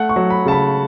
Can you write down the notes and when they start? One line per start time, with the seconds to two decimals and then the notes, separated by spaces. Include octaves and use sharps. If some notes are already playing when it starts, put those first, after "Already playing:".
Already playing: A3 F#5
0.09 C#6
0.16 F#3
0.30 B5
0.46 C#3 A5
0.52 B5